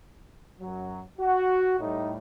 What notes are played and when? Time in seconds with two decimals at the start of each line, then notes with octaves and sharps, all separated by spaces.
0.61 F#2 F#3
1.19 F#4
1.79 A2 G3 D#4